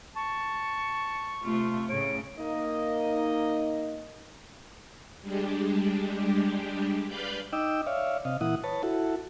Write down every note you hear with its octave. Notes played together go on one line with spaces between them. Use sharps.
A5 C#6
C3 A3 F4
A2 C#3 C#5 D7
A#3 D#4 D#5
G3 G#3 D4 G4
B4 D5 F5 B5 G6
D#4 D#5 G5 D6 E6
C#5 D5 E5 F5
C3 D#5 F5
A#2 E3 E4 F#5 D#6
B4 C#5 A5
E4 F#4 A4